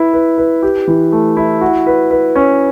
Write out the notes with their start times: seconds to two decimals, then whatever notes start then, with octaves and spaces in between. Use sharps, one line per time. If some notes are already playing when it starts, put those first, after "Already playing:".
Already playing: E4 B4
0.13 B4
0.38 B4
0.63 G4
0.87 E3
1.12 A3
1.37 E4
1.61 F#4
1.86 B4
2.11 B4
2.35 C#4